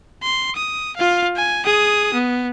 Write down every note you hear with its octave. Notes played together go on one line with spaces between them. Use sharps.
C6
D#6
F4 F5
G#5
G#4 D#6
B3